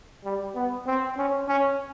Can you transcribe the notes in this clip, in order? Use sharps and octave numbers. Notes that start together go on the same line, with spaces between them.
G3
B3
C4
C#4
C#4